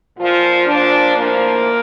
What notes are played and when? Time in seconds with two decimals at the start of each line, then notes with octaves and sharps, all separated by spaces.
0.17 A#2 F3 F4
0.66 A#2 F3 D4
1.16 A2 F3 A#3